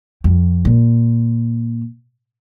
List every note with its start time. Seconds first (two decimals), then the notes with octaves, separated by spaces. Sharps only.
0.24 F2
0.65 A#2